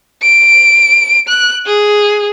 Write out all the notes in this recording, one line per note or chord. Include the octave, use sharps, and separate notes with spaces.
D7
F#6
G#4